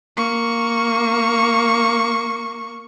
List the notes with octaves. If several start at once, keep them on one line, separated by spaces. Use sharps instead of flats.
A#3 C#6